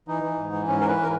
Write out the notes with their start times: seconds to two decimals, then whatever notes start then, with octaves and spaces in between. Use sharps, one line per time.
0.08 E3 D#4
0.23 E3
0.38 G#2
0.52 E3
0.67 G#2 C#4
0.82 E3 A#4
0.88 B4
1.03 A#4